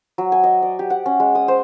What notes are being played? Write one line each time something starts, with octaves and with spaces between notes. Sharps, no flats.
F#3
G#5
D#5
D5
G4
F#5
C#4
G#3
D#6
C5